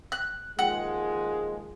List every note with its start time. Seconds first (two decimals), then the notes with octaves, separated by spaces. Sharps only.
0.12 F#6
0.59 D#2 F3 G#3 F#5